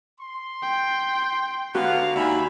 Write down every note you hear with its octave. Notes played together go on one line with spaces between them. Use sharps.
C6
G5
D3 B3 F#4 C#5 F5 A#5
D#2 D4 E5 G#5 B5